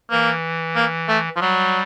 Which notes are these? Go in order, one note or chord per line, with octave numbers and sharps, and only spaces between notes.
E3 A#3
A#3
A3
F3
F#3 G3